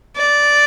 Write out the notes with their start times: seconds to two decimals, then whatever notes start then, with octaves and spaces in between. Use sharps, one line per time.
0.17 D5